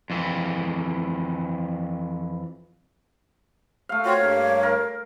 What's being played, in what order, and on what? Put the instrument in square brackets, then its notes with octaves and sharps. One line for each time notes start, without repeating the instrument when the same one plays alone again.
[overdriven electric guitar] F2 E3
[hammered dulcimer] A3 F5
[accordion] C4 F4 F#4 [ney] C#5
[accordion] G2 A#3
[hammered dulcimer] A#4